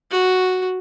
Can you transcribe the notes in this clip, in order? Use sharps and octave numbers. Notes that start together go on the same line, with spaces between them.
F#4